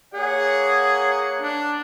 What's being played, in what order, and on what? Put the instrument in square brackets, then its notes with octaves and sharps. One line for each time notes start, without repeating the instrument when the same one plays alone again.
[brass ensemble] A#3 C#5 F#5 [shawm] G#4
[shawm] D4